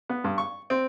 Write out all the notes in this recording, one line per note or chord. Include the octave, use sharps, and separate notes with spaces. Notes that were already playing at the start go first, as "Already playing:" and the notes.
B3
G2
C#6
C4